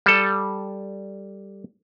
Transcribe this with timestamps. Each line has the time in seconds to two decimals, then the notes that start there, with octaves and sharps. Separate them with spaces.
0.06 G3 A4